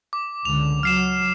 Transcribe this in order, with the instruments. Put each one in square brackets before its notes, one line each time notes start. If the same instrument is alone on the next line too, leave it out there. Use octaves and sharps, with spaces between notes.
[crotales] D6
[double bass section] C#2 D3 [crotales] F7
[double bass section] F#3 [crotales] F6 C7 E7